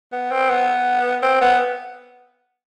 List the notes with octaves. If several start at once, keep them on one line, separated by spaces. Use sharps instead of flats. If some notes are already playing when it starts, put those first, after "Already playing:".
B3
C4
B3
C4
B3